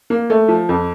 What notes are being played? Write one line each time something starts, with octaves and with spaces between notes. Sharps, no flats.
A#3
A3
F3
F2